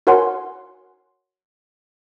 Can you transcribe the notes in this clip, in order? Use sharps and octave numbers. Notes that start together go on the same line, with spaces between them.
F#4 A#4 C#5 F#5 G#5 C6